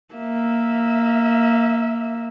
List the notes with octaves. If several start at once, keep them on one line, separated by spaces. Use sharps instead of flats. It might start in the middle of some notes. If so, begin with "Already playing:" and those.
A#3 E5